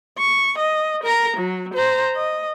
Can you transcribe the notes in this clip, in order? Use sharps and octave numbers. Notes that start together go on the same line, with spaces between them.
C#6
D#5
A#4 A#5
F#3
C5 A#5
D#5